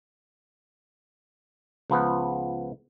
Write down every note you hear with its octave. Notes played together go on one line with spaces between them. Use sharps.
C#2 F3 B3